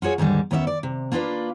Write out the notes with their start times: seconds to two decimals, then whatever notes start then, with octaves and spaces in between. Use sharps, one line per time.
0.02 F4 F#4 G#4 C#5
0.18 D#2 G#2 D3 G3
0.51 D#2 B3 C#4 D5 E5
0.67 D5
0.83 C3
1.12 A#3 D4 F4 G#4 B4 D5